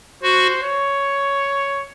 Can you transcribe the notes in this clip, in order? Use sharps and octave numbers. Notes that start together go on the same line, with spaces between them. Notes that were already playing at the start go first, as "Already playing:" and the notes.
F#4 C5
C#5